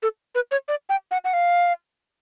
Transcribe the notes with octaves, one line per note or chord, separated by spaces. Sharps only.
A4
B4
C#5
D5
G5
F#5
F#5
F5